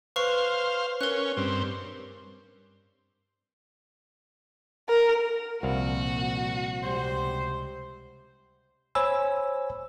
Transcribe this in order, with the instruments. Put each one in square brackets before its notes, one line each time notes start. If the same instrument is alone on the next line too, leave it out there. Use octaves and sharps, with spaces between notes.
[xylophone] B4 C#6 [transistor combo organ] C5 F5
[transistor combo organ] C#4 [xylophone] A#4 F#6
[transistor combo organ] G2 C4
[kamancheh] A#4
[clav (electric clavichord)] C2 F5 [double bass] A#2 F3 [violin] F#4
[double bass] C#2 C3 [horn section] G3 C5
[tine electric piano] C5 C#5 G#5 B5 E6